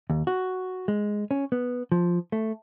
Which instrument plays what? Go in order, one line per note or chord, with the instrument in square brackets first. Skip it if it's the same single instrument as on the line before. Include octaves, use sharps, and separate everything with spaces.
[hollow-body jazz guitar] D#2
F#4
G#3
C#4
B3
F3
A3